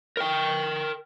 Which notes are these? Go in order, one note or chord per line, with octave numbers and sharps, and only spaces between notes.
A#4 G5